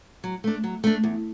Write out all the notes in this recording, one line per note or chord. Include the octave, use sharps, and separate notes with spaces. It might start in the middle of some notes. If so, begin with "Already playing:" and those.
F#3
A3 D4
F#3
A3 D4
E2